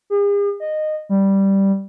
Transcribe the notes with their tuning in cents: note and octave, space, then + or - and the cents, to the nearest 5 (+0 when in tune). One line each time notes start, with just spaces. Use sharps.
G#4 -45
D#5 -15
G3 -5